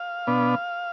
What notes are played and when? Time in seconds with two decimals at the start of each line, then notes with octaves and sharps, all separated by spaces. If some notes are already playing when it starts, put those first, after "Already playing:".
Already playing: F5
0.27 B2 B3 D4